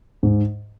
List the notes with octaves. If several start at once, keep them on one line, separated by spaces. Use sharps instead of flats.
G#2